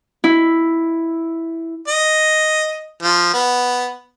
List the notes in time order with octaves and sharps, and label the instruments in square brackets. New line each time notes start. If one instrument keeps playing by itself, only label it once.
[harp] E4
[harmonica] D#5
F3
B3